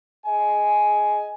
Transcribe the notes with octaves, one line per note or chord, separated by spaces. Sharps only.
G#4 D#5 G#5